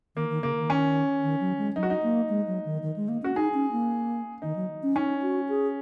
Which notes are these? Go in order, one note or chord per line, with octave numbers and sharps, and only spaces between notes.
D#3 A#3
D#3
C#3 A#3
D#3
C#4
D#3
F#3
G#3
F#3 D#4
F#4
D#4
A#3
G#3
F#3
D#3
D#3
G#3
A#3
C#4 F#4
D#4 G#4
C#4
A#3
D#3 D#4
F#3
C#4
C#4 D#4
F#4
G#4